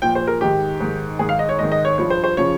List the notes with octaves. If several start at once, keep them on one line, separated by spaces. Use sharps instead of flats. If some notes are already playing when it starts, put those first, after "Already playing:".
A#2 F3 G5
C5
A#4
G#2 D#3 G4
G#2 D#3
G#2 D#3 G#4
F5
D#5
C#5
G#2 D#3 D#5
D#5
C#5
G2 F3 C#5
C5
C5
C#3 F3 C#5